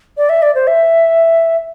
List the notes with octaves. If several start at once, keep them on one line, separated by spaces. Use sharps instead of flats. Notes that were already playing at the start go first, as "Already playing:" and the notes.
D5
E5
D5
C5
E5